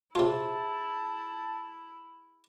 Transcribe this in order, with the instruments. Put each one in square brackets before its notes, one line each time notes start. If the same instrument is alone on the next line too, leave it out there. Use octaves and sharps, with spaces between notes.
[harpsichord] C3 F4 [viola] E4 [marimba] G#4 C5 E5 [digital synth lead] A5